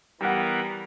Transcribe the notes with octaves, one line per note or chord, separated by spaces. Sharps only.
E3 G3 B3 A#4 F#5